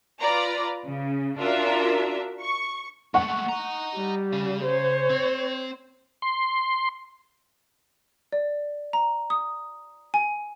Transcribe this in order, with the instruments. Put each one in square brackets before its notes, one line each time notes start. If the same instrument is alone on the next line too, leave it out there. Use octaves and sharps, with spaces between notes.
[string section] F4 B4 D5 A#5
C#3
D4 F4 F#4 A#4 E5
C#6
[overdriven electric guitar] G#3 A3 [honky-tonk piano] F#5 C#6
[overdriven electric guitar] D#5 A#5
[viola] G3
[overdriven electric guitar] C#3
[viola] C5 C#5
[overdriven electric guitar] C4
[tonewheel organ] C6
[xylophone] D5
A#5
D#6
G#5